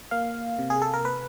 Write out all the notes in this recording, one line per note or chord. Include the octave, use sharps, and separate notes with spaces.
A#3 F5
C3
G#4
A4
A#4
B4